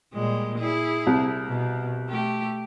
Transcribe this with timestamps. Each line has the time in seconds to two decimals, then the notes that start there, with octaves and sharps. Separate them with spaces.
0.14 A#2 G3 G#3
0.58 E4 G#4
1.07 C2
1.48 B2
2.09 A3 G4